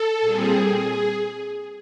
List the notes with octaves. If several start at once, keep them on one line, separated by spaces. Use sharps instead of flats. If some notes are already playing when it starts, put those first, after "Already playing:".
Already playing: A4
A#2 G3 C4 G#4
G#4